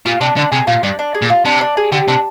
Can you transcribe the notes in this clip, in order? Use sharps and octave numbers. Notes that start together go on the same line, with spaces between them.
A#2 F4
C3 D4
D3 D4
C3 G#4
A#2 F4
G2 D4
D4
G#4
A#2
F4
C3 D4
D4
G#4
D3 G4
C3 D4